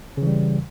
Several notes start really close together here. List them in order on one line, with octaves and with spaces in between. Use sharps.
C#3 E3 G3